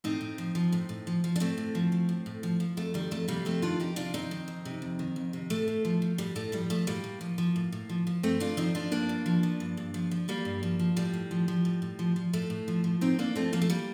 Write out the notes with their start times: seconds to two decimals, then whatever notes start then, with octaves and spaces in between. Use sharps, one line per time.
0.04 A2 C4 D#4
0.21 A2
0.38 F3
0.55 F3
0.72 A2
0.89 A2
1.07 F3
1.24 F3
1.36 D4
1.40 A2 A3 C4
1.58 A2
1.75 F3
1.92 F3
2.09 A2
2.26 A2
2.43 F3
2.60 F3
2.77 F2 A3
2.94 D#3 G3
3.11 F2 A3
3.28 C3 G3 A#3
3.45 F2 A3 C4
3.62 D#3 D4 F4
3.80 F2 D#4 G4
3.96 C3 D4 F4
4.14 F2 C4 D#4
4.31 D#3
4.48 F2
4.65 C3
4.82 F2
4.99 D#3
5.16 F2
5.33 C3
5.50 A2 A3
5.68 A2
5.85 F3
6.02 F3
6.18 A2 G3
6.36 A2 A3
6.52 F3 G3
6.70 F3 A3
6.87 A2 G3 A#3
7.04 A2
7.21 F3
7.38 F3
7.56 A2
7.72 A2
7.89 F3
8.07 F3
8.23 G2 A3 C4
8.40 G2 D4 F4
8.57 F3 C4 D#4
8.75 F3 D4 F4
8.92 G2 A#3 D4
9.09 G2
9.26 F3
9.43 F3
9.60 G2
9.77 G2
9.94 F3
10.11 F3
10.28 G2 G3 A#3
10.45 G2
10.63 F3
10.79 F3
10.96 A2 G3
11.14 A2
11.31 F3
11.48 F3
11.65 A2
11.82 A2
11.99 F3
12.16 F3
12.33 A2 A3
12.50 A2
12.68 F3
12.84 F3
13.01 A2 C4 D#4
13.19 A2 A#3 D4
13.36 F3 A3 C4
13.53 F3 A#3
13.62 A3
13.70 G3 A#3